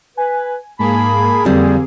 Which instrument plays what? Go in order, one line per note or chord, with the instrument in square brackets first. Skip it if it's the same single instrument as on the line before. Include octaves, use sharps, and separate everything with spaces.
[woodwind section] B4 [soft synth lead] G#5
[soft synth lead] G#2 [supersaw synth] A#3 G#4 [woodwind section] G#5 A5 B5
[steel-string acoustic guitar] F2 G3 [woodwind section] D3 [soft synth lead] C4